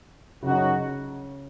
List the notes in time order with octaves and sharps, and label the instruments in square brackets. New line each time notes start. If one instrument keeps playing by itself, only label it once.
[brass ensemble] F#2 F#3 D#4 F#4 [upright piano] C#3